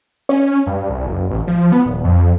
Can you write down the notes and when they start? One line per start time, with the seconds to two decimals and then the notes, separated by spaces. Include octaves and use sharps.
0.29 C#4
0.67 G2
0.90 C2
1.06 F#1
1.30 A1
1.47 F3
1.72 B3
1.85 D#1
2.04 F2